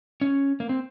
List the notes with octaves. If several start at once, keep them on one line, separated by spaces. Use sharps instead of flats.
C#4
A#3
C4